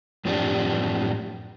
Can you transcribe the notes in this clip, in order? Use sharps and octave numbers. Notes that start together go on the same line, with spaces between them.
F#2 A2 F3 C4 D4 G4